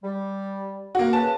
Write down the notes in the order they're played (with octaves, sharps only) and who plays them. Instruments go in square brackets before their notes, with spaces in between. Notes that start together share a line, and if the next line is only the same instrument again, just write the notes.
[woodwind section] G3
[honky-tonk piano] A#3 F#4
[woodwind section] C#3 B4 [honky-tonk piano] A5